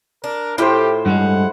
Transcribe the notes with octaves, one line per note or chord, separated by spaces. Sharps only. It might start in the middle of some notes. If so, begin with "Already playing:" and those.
D4 A#4
A2 E4 F4 G4 C5 G5
G2 G3 G#3 F#5